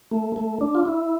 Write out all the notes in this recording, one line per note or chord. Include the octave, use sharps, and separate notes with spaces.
A3
A3
D4
F4
E4